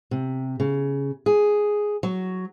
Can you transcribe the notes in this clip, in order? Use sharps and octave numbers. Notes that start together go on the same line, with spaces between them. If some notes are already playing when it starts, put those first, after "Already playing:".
C3
C#3
G#4
F#3